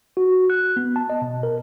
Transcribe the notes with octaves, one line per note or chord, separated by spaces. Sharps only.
F#4
F#6
B3
A5
D#5
B2
A#4